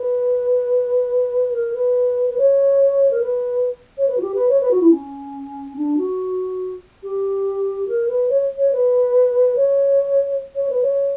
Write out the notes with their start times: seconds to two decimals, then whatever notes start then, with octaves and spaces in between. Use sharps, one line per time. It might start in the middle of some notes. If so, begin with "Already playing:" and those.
Already playing: B4
1.53 A#4
1.73 B4
2.30 B4
2.38 C#5
3.11 A#4
3.21 B4
3.97 C#5
4.07 B4
4.17 F#4
4.21 G4
4.34 B4
4.49 C#5
4.60 B4
4.70 F#4
4.80 E4
4.90 C#4
5.76 D4
5.97 F#4
7.03 G4
7.87 A#4
8.08 B4
8.29 C#5
8.58 C#5
8.72 B4
9.56 C#5
10.55 C#5
10.69 B4
10.83 C#5